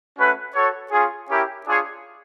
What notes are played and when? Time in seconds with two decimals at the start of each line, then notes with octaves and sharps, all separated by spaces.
0.18 A3 C#4 F#4 B4
0.54 F#4 A4 C#5
0.91 C#4 F4 G#4
1.28 C#4 E4 G4 A#4
1.65 D4 F4 G#4 C#5